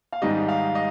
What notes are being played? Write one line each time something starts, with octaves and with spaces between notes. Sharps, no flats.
F5
G#2 D#3 G3 D#5
F5
D#5